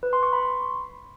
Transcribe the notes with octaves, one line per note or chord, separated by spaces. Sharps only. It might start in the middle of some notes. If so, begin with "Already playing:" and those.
B4
C6
C#6
B5
C6